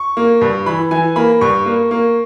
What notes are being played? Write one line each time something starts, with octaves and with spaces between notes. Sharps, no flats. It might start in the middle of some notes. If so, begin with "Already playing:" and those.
Already playing: C#6
A#3
G2
E3 B5
E3 G#5
A#3 B5
G2 C#6
A#3
A#3